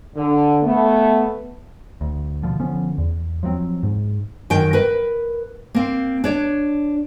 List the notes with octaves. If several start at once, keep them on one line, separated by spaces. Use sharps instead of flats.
D3
A3 B3
D2
B2 D3 F3
D3 F3 B3 C#4
E2
F3 F#3 A3 C4
G#2
F#2 D#3 G5
A#4 B4
A#3 C4
D4 C#5 D5